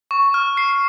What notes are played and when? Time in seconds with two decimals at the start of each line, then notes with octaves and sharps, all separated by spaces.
0.11 C#6
0.34 F6
0.57 C7